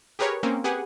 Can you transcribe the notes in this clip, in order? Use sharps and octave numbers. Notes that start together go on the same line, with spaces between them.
G4 G#4 A#4 B4 C#5
A#3 C4 C#4
G4 G#4 B4 F#5 G#5